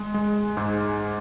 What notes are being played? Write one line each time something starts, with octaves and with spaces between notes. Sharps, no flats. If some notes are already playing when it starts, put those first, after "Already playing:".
Already playing: G#3
G#3
G#2